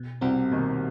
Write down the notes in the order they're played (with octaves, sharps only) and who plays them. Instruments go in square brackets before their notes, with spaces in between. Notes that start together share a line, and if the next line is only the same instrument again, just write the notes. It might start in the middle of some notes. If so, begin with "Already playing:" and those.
Already playing: [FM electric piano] B2
[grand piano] C2 C3 [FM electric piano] G3 C4 F#4
[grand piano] D#2 D#3 [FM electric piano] B2